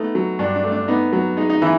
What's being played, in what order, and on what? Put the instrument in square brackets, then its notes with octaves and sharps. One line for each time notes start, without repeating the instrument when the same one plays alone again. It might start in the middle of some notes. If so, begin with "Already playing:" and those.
Already playing: [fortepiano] A3 B3 D#4
F#3
G2 D4
D4
A3
D4
B3 D#4
F#3
G#3 D#4
D#4
E3 E4